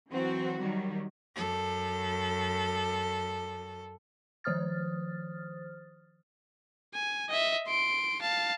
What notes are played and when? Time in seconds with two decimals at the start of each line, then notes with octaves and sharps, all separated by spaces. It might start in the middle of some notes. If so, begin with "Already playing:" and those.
0.11 E3 F#3 C4 F#4
0.61 D#3 F#3 G3
1.35 F#2 A4
4.44 D#3 F3 C5 D#6 F6 A6
6.94 G#5
7.29 D#5 E5
7.67 C6 D7
8.21 F5 A5